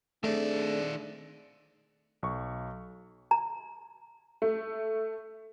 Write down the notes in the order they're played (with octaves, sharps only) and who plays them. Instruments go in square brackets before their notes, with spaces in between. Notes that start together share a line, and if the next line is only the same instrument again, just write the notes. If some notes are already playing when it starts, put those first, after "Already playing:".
[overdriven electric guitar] D#3 D5 [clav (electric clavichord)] A3 [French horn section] C4 D4 G#4
[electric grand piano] B1 C#6
[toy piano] A#5
[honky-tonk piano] A3